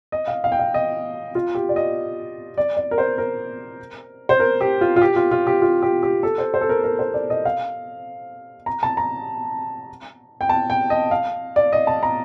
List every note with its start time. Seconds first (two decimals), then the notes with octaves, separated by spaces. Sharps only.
0.12 D#5
0.28 F5
0.44 F5
0.52 G5
0.59 F5
0.74 D#5
1.35 F4
1.55 G4
1.69 D5
1.76 D#5
2.58 D5
2.77 D5
2.91 A#4
2.98 C5
3.18 A#4
4.29 C5
4.40 A#4
4.61 G4
4.81 F4
4.96 F4
5.02 G4
5.16 F4
5.31 F4
5.47 G4
5.62 F4
5.82 G4
6.03 G4
6.23 A4
6.38 C5
6.54 C5
6.61 A4
6.69 A#4
6.84 A#4
6.99 C5
7.14 D5
7.30 D#5
7.45 F5
8.66 A#5
8.83 A5
8.97 A#5
10.41 G5
10.49 A5
10.70 G5
10.90 D#5
11.11 F5
11.56 D5
11.73 D#5
11.87 A5
12.03 A#5